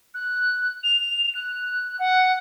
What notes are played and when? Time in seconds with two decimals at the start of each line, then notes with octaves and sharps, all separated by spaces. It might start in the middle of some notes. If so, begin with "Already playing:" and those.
0.14 F#6
0.83 F7
1.35 F#6
1.99 F#5